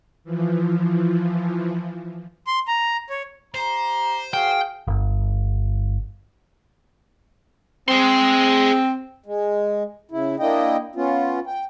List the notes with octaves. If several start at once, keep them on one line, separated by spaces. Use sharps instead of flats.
E3 F3
C6
A#5
C#5
G4 C5 A#5
F#4 G#4 F5 G5
G1
C4 G#4 C6
G#3
C#3 E4
A#3 D4 E4 D#5 G5
B3 C#4 F4
G5